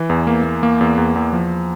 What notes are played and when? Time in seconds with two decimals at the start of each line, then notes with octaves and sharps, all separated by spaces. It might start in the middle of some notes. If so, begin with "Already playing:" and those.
Already playing: E3
0.10 E2
0.27 A#3
0.44 A#3
0.63 A#3
0.81 E2
0.98 E2
1.16 E2
1.33 F3